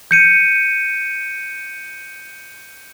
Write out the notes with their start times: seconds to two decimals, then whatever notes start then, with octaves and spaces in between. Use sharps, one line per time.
0.11 G6 C#7 D#7